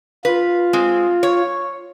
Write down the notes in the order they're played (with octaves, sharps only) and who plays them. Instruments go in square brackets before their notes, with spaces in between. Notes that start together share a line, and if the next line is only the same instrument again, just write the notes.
[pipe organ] F4 [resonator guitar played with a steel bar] B4
[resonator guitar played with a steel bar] G#3 C4
C#5